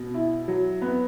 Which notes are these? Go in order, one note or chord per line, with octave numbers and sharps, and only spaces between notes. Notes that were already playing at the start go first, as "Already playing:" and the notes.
Already playing: B2
E4
F#3
B3